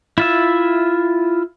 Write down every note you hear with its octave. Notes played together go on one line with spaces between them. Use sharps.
E4 F4 E5